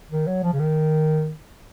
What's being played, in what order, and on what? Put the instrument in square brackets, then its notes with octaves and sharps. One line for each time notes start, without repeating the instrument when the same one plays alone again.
[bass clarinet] D#3
F#3
F3
C#3
D#3